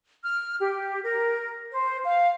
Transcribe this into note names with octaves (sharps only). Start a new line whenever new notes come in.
F6
G4
A#4
C5
F5